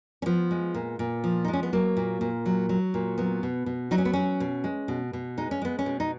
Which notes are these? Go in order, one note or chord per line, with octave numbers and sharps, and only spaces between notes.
C#4
F3 B3
G#3
A#2
A#2
F3
D#4
G#3
C#4
B3
F#3 A#3
A#2
A#2
F#3
F#3
A#2
F#3 B3
B2
B2
F#3 D#4
C#4
B3
F#3 C#4
B2
G#3
B2
B2
G#3 D#4
C#4
G#3 B3
C#4
B2
D#4